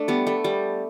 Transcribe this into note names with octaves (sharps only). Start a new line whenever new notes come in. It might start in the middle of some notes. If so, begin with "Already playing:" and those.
Already playing: A3 D4
G3 B3
A3
G3